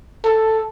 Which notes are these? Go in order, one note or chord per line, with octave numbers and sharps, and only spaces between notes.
A4